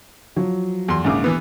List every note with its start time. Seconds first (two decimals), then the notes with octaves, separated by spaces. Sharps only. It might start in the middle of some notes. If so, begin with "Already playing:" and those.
0.36 F3 F#3
0.88 E2 C6
1.04 A#1 G#2 C#3 D6
1.24 E3 B3